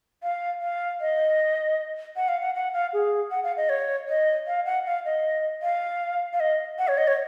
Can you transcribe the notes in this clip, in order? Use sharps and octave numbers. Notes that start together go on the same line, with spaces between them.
F5
F5
D#5
F#5
F5
F#5
F#5
F5
G#4
F#5
F5
D#5
C#5
D#5
F5
F#5
F5
D#5
F5
F5
D#5
F#5
C#5
D#5
C#5